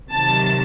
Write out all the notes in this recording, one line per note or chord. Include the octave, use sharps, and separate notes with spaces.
C3 D#3 F#3 A5